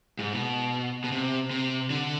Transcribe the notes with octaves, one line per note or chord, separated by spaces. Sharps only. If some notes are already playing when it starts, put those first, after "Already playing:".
G#2
B2
B2
C3
C3
D3